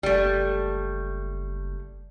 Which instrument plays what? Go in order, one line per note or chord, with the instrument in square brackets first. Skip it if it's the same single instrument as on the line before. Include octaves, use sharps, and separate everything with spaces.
[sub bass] F#1 [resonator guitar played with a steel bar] G3 A3